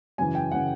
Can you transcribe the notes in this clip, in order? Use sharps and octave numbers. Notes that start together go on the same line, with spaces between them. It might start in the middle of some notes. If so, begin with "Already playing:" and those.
F#2 C#3 E3 G#5
G5
C#3 E3 F#5